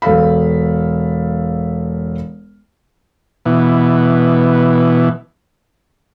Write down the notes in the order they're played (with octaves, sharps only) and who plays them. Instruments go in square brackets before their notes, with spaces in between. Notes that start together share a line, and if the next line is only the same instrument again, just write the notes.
[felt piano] E1 A4 F5 B5
[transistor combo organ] B2 E3